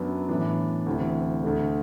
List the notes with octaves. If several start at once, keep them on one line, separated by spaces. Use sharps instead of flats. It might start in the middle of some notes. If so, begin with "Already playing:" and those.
Already playing: F#2 F#3 B3 D4
A2 E3 B3 D4
D2 C3 E3
D2 D3 A3